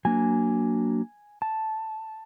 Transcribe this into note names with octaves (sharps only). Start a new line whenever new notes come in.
F#3 A#3 D4 G#5
A5